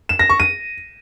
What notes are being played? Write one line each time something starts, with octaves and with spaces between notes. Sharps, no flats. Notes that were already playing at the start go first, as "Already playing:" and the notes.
E7
A#6
C#6
D#7